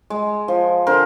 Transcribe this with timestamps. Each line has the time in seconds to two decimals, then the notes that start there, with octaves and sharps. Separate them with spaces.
0.10 G#3
0.48 F3
0.87 D3 A#4 C5